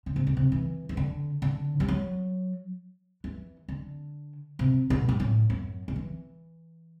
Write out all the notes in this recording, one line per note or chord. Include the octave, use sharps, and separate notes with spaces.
D3
C3
B2
C3
E3
E3
D3
D3
G3
F#3
E3
D3
C3
B2
G2
A2
F#2
D3
E3